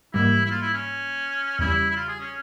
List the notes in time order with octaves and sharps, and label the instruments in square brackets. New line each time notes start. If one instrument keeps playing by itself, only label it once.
[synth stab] G#2 E3 G3 A#3 [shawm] E4
[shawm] E4
F4
E4
C#4
[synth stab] E2 C#3 G3 [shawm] E4
[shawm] E4
F4
G#4
C#4